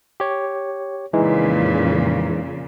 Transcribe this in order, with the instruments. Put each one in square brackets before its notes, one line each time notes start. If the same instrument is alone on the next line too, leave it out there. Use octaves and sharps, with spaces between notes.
[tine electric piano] G4 C#5
[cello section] F2 A#2 C#3 [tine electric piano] E3 G#3 D#4